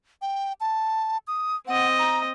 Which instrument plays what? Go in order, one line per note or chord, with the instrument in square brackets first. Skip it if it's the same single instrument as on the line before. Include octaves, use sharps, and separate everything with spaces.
[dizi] G5
A5
D#6
[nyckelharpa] C4 D#5 [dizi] F#5
[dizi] A#5